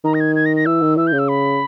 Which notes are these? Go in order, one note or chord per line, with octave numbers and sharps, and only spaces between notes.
D#3 A#5
A#6
G#6
G#6
A#6
A#6
E3 E6
D#3
E3 E6
G6
C#3
E6
B5